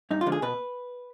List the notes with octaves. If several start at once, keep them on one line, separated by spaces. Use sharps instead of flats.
G2 D#4
F4
D3 F3 G#3
G#4
B2 B4